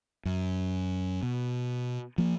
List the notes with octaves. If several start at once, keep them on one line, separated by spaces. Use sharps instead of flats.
F#2
B2
F3 A#3